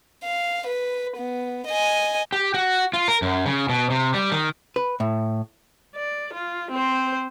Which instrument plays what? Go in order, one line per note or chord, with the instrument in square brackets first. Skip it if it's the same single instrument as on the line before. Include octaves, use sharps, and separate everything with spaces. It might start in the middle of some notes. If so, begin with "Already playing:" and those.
[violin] F5
B4
B3
D#5 G#5
[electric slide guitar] G4
F#4
F4
A#4
F#2
C#3
B2
C3
G3
D#3
[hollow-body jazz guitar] B4
A2
[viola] D5
F4
C4 C5